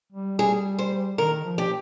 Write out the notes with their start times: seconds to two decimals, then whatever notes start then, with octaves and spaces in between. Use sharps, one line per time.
0.12 G3
0.39 G3 G#4
0.79 C5
1.18 D#3 A#4
1.45 F3
1.58 G4